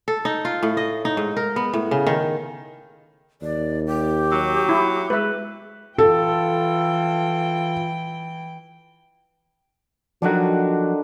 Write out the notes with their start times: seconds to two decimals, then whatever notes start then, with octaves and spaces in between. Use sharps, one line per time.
0.08 A4
0.25 D#4
0.45 F4
0.63 A2
0.77 D#5
1.05 D#4
1.17 G#2
1.37 A#4
1.56 B3
1.73 A2
1.91 C#3
2.07 D#3
3.42 D#2 D5
3.86 G4
4.32 F#3
4.69 E4
5.10 G#3 B4 E5
5.98 E3 F4 A4 G5
10.22 D3 D#3 F3 F#3 D4 F#4